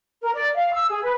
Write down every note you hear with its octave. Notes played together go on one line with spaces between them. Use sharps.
A#4
D5
F5
E6
G#4
B4